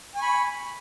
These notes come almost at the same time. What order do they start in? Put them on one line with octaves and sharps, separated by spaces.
G#5 C#6 B5